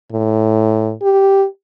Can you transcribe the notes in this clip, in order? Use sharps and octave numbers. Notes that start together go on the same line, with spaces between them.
A2
G4